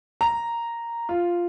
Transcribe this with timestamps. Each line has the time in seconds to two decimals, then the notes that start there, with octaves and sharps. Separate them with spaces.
0.21 A#5
1.09 F4